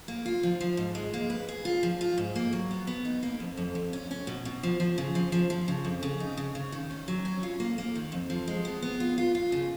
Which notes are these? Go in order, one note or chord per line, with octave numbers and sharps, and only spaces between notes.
A#3
F4
F3
F3
G#2
G#3
A#3
B4
G#4
F4
F3
F4
G#2
A#3
F#3
B3
B3
D#4
A#3
F2
F2
F2
C#4
C#4
B2
B2
F3
F3
C#3
F3
F3
F3
C#3
F2
C#3
D#4
C#3
C#3
D#3
C#4
F#3
C#4
F4
A#3
A#3
D#3
F2
F3
G#3
B3
B3
F4
F4
F4
C#3